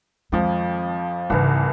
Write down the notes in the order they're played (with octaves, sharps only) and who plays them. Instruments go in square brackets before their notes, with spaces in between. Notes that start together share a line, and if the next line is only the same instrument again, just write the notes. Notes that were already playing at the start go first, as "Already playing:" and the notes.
[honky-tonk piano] F2 F3 [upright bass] D#3 G#3
[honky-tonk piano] C2 E3 [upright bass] G#2 C#3